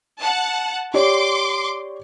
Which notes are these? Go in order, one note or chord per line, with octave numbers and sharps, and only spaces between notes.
F#5 A5
G4 C#5 D5 C6 D6